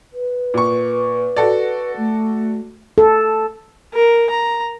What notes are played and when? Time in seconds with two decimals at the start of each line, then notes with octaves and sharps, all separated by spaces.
0.13 B4
0.54 A#2 C#6
1.37 F#4 A4 D5
1.97 A3
2.98 A4
3.94 A#4
4.30 A#5